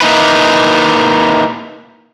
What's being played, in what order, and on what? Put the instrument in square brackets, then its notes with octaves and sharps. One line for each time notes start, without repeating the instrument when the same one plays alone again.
[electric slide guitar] A#3 D#4 E4 B4